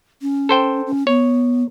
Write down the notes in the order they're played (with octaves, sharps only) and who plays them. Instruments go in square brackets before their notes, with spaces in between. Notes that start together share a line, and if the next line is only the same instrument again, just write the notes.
[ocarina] C#4
[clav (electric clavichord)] A4 C5 G5
[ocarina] C#4
[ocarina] B3 [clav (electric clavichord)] C#5